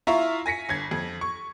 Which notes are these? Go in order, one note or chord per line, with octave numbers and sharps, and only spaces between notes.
E4 F4 E5 F5 A#5 C#6
G#5 A#6 B6 C#7
G1 G#6
F2
C#6